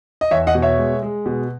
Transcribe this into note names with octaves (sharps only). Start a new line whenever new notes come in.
D#5
E2 C#5 E5
D#5 F#5
B2
C#5 E5
G#3
G#3
B2